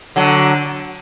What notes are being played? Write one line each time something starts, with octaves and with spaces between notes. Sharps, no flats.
D3 F#3